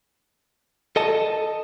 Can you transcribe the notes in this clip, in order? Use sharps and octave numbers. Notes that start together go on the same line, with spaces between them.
A4 D#5 A5